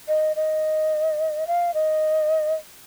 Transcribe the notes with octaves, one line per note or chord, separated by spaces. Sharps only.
D#5
D#5
F5
D#5